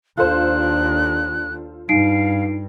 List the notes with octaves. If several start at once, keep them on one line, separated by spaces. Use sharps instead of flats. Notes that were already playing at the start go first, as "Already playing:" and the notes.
D#2 D4 F4 A4 C5 F#6
G2 D#4 F5 C7 D7